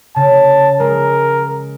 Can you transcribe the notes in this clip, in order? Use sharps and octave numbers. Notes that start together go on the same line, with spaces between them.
C#3 A5
G#3 A#4